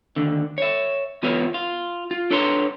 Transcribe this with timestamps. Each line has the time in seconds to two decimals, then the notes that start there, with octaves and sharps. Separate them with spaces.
0.16 D#2 D3
0.58 C#5 E5
1.23 E2 B3 F4 B4 C#5 E5
1.54 F4
2.11 F4
2.31 D4 A4 B4 C#5 A#5 C6